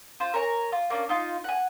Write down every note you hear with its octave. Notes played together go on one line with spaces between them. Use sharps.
F4 C5
A#4 C#5 G#5
F4
A#3 C#4 D4
D#4 F4
F#5 G#5